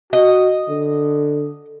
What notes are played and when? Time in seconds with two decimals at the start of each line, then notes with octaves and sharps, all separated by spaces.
0.13 F#4 D#5
0.69 D3